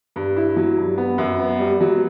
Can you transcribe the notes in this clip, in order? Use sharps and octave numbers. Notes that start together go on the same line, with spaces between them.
G2
E4
F#3
G2
B3
F#2
B3
G3
F#3